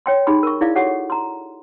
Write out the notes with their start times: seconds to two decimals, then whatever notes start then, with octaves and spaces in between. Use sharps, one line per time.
0.06 C#5 G5 C6
0.27 D#4 G4 G#4 B5 C6
0.43 A#4 C#6
0.61 E4 G#4 D5 F5
0.76 F#4 G4 A4 C#5 F#5
1.10 A#5 C6